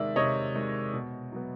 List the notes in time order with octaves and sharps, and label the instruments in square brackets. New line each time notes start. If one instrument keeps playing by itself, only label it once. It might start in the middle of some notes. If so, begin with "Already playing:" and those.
Already playing: [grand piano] C3 D#3 G#3 D5 E5
C3 C#5 D#5
D#3 G#3
B2
F#3 B3